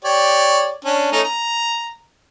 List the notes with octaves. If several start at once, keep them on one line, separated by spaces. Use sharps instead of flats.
G4 C#5 D5
C#4 D4
A3 C#4 D#4
A#5